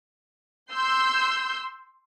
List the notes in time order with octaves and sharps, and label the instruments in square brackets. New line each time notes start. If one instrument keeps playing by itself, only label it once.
[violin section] C6 E6 G6